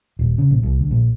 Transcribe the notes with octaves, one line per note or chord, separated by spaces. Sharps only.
D#1
C#3
A#1
C2
D2
A#1